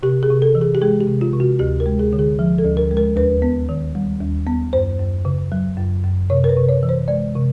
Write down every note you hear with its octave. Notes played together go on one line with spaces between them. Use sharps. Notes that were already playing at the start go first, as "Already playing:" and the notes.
C3 G4
G#4
C3
A4
E3
G#4
G4
G#3 G#4
G4
C3
F4
C3
F#4
D2 G4
A#4
G#3
G#4
D3
G#4
F3
A4
D2
A#4
G#3
A#4
D#2 B4
B3
D#3
G3
D#2
B3
F#2 C5
F#2
C#3
F#3
F#2
F#2
C3 C#5
A#4
B4
C3
C#5
E3
C5
G#3 D5
C3